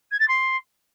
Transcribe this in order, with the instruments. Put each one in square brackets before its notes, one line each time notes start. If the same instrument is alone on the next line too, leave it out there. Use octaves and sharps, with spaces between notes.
[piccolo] G#6
A6
C6